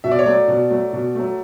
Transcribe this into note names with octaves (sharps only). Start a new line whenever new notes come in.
B2 E5
D5
C#5
F#3 A3 D5
B2
F#3 A3
B2
F#3 A3